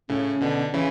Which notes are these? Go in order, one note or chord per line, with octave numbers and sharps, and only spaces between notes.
A2 C#3 C#4
B2 D3
C#3 E3 C#4